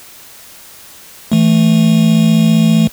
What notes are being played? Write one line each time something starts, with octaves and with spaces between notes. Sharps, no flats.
E3 A3